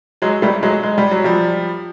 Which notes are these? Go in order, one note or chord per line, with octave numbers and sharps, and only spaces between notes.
F#3 G#3
G3 A3
F#3 G#3
G#3
G3
F#3
F3 G3